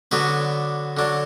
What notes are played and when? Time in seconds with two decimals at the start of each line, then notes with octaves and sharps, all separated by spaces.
0.11 D3 F#3 B3 D4 F#4 B4
0.97 D3 F#3 D4